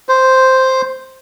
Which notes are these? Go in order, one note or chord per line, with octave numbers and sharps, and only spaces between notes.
C5